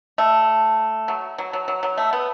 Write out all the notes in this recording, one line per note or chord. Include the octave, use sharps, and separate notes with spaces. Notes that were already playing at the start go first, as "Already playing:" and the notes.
A3
F#3
F#3
F#3
F#3
F#3
A3
B3